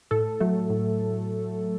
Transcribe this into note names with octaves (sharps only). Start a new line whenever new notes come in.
A2 A4
F#3 A3
A2